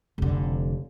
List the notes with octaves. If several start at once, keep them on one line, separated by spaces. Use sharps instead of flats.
F1 D3